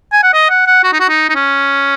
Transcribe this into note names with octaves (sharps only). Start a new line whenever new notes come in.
G#5
F#5
D#5
F#5
F#5
F#4
D#4
F#4
D#4
D#4
C#4